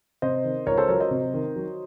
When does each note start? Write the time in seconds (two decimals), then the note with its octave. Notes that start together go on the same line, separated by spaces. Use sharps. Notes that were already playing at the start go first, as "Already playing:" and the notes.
0.22 C3 C5 D#5
0.44 D#3
0.66 C#2 A#4 C#5
0.77 A4 C5
0.88 F#3 A#4 C#5
1.00 C5 D#5
1.11 C3
1.34 D#3
1.56 F#3